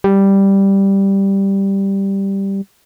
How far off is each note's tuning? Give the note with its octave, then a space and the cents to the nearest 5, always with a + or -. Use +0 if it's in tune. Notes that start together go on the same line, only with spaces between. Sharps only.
G3 +0